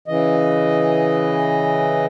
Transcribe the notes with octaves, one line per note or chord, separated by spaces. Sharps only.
C#3 E3 D#5